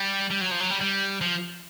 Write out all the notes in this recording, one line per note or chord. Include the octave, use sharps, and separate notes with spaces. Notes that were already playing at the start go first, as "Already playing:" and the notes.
Already playing: G3
G3
F#3
F3
F#3
G3
G3
F3